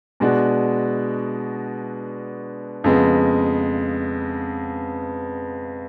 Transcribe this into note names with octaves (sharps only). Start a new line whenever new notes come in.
B2 G#3 D4 F#4
F2 C#3 G#3 B3